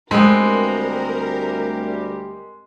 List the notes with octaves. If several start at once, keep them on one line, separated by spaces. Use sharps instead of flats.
D2 G3 G#3 B3 C4 G4 A#4